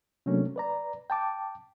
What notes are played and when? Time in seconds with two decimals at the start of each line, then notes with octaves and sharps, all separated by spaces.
0.26 C3 F#3 A3 A#3 C#4 D4
0.56 B4 D5 A#5
1.10 G5 A5 D6